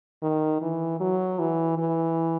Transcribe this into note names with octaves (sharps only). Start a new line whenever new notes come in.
D#3
E3
F#3
E3
E3